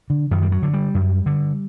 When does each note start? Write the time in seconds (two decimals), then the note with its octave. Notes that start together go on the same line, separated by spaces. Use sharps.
0.10 D3
0.31 F#2 D#3
0.42 G3
0.52 F#3
0.62 D3
0.73 G3
0.94 F#2
1.26 D3